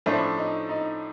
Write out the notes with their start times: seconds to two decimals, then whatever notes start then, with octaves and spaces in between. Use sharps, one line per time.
0.06 A2 F3 A3 C#4 D4
0.38 D#4
0.69 D#4